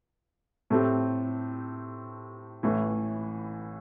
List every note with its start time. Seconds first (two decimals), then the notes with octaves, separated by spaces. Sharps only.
0.70 A2 A3 C4 G4
2.63 A1 A2 E3